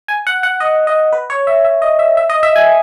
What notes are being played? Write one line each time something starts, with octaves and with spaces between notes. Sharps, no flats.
G#5
F#5
F#5
D#5
D#5
B4
C#5
E5
E5
D#5
E5
E5
D#5
E5
G#5